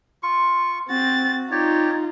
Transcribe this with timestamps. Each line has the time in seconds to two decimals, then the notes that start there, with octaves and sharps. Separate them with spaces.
0.23 F4 C#6
0.89 C4 F#4 A6
1.51 D#4 F4 G4 C#5 D5